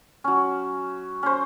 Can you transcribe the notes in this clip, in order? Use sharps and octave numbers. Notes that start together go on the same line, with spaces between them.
F#3 C#4
C#4 C5